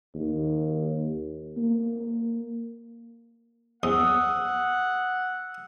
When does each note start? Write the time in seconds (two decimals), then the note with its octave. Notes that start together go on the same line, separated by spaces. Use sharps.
0.15 D#2
1.57 A#3
3.83 E2 F#5 D#6 E6